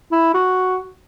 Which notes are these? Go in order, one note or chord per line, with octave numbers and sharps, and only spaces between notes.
E4
F#4